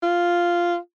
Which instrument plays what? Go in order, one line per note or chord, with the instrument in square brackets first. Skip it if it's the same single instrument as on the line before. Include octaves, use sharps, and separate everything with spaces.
[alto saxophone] F4